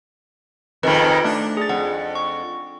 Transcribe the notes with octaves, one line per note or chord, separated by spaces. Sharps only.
F2 G#2 D#3 B4
A3 D4
G#4 A6
F2 F#5
C#6